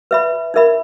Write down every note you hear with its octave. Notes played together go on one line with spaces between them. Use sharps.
B4 E5 B5
D#4 A#4 E5 B5